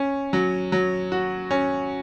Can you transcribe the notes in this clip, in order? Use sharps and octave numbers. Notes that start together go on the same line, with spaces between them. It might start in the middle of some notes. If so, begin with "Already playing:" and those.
Already playing: C#4
F#3
F#3
F#4
C#4